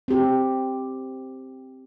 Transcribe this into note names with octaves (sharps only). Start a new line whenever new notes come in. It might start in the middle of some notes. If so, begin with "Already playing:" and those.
C4 G4